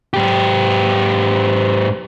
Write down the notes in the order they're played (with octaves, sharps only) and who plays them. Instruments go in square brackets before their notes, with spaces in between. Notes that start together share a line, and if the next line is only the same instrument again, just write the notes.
[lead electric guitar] G#2 G4